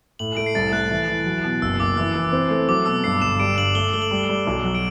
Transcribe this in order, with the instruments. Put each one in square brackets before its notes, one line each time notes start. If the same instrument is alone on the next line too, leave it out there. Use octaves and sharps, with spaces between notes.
[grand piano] A2 [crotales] F#7
[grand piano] A3 [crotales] D7
[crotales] C7
[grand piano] C2 [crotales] A6
[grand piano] A3 [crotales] F#6
[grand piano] E3
E3
F#3
B2
[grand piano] F#1 [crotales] E6
[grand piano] F#1 [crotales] D6
[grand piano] E3 [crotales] E6
[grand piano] E3
C4
A3
[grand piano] F#3 [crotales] D6
[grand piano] B2 [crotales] E6
[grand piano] G2 [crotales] C7
[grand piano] G1 [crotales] E7
[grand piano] G3 [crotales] D7
[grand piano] G2 [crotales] F#7
[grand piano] A3 [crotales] G7
[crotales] F#7
[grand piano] A3 [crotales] G7
[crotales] F#7
[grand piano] G3
G3
B1
F#3
[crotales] D7